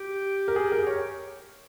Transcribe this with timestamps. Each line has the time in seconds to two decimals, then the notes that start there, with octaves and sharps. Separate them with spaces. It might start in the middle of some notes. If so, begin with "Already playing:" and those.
Already playing: G4
0.48 A#4
0.56 G#4
0.72 A#4
0.87 C#5